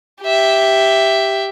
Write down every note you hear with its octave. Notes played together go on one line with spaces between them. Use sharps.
G4 E5